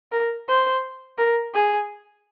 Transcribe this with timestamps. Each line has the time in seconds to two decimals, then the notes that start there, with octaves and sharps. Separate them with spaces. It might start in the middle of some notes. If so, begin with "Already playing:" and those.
0.12 A#4
0.48 C5
1.18 A#4
1.54 G#4